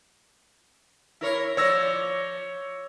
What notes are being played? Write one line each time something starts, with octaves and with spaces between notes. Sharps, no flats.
E4 A#4 C#5
F3 C#5 D5 E6 A#6